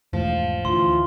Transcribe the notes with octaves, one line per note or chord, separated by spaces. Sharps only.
E1 G#2 F3 A3
D2 E3 F4 C6